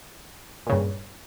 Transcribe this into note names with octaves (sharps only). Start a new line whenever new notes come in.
G2 A#2 C#3